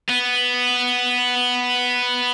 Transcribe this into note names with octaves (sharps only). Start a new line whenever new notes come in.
B3